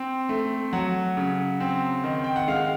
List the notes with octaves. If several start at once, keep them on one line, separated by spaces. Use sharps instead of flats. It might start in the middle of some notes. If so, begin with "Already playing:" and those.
Already playing: C4
A3
F#3 F#5
C#3
C4
D#3
G5
F#5
G#3 F5